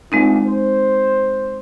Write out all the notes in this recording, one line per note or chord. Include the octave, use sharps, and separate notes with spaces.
D2 A#2 G#3 C4 D#4
C5